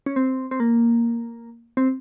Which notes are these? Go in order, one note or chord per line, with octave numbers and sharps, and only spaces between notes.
C#4
C4
C4
A#3
C4